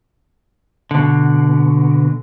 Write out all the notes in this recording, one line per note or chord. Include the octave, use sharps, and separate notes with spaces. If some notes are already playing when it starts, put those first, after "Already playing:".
B2 D3